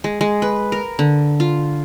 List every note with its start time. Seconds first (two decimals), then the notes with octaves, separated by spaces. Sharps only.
0.04 G#3
0.21 G#3
0.42 B4
0.72 A#4
0.99 D3
1.40 F4